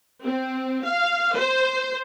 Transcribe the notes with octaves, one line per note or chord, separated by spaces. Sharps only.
C4
F5
C5